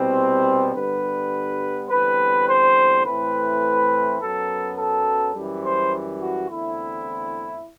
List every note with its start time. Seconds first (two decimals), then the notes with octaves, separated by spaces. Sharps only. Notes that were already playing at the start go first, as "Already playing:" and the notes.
Already playing: C2 B2 G3 B3 C4
0.75 G2 D3 G3 B3 B4
1.90 E2 D3 G3 C4 B4
2.47 C5
3.05 A2 E3 A3 C4 B4
4.20 F#2 F#3 B3 A4
4.77 A4
5.35 F#2 E3 G3
5.64 C5
6.21 F#4
6.50 E2 D3 A3 C4 E4